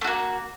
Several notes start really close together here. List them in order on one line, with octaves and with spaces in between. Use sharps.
A3 F#4 A#3